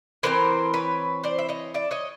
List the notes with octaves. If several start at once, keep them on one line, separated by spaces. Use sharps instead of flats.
E3 G#3 C4 A#4 C5
B4 C#5
C5 D5
E5
C#5 D#5
D5 E5
C#5 D#5